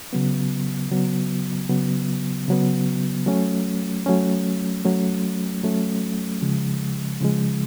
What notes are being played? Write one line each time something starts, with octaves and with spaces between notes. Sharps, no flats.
C#3 F#3 B3
C#3 F#3 B3
C#3 F#3 B3
C#3 F#3 B3
F#3 A3 C#4
F#3 A3 C#4
F#3 A3 C#4
F#3 A3 C#4
C#3 F3 G#3
C#3 F3 G#3